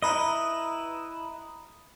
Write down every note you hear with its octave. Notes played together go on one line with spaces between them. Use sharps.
E4 B4 D#5 A#5 B5 D#6